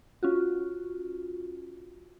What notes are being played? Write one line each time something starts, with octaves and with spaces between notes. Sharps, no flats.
C#4 F4 F#4